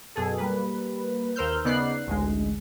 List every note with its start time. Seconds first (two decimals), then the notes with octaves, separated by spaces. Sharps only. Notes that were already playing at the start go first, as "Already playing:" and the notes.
0.15 F#2 B2 G#4 A4
0.38 G3 A#3 B4
1.36 D#2 A#4 C5 E6 F6 G6
1.64 C#3 B3 D#4 D5 F#6 C7
2.07 A1 D2 G#3